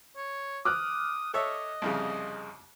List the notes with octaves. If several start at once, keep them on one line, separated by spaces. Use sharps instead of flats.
C#5
D6 D#6 F6 F#6
A4 C#5 D#5 E5
C2 F2 C#3